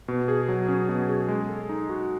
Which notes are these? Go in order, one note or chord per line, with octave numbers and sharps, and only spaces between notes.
B2
G#4
F#3
C#4
B2
G#4
G#3
A4
D#4
F#4